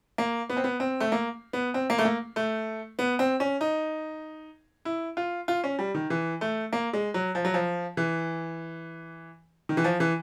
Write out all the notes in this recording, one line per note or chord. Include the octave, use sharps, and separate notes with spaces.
A#3
B3
C4
B3
C4
A3
A#3
B3
C4
A#3
A3
A#3
A3
B3
C4
C#4
D#4
E4
F4
F4
C#4
G3
D#3
E3
A3
A#3
G#3
F#3
F3
F#3
F3
E3
D#3
E3
F3
E3